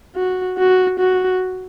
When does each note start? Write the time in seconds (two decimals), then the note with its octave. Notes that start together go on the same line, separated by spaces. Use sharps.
0.16 F#4
0.58 F#4
0.99 F#4